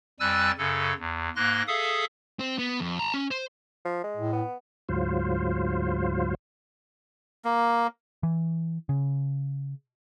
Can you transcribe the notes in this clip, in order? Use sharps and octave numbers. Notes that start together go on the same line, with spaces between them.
F2 G3 G#5 E6 F#6 A6
F#2 C#3 A4
E2
G#2 A#3 C6 F#6 A#6
G#4 A4 E5 F5 D#6
C4
B3
F2
A5 A#5
C#4
C5
F3
G#3
A2
B3
D2 G#2 F#3 F4 C5
A#3
E3
C#3